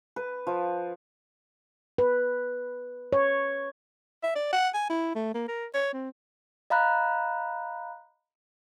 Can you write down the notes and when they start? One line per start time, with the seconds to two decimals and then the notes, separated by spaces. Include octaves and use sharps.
0.16 B4
0.47 F3
1.98 B4
3.13 C#5
4.23 E5
4.35 D5
4.53 F#5
4.74 G#5
4.90 E4
5.15 A3
5.34 A#3
5.48 A#4
5.74 C#5
5.93 C4
6.70 D#5 F5 A#5 B5 F#6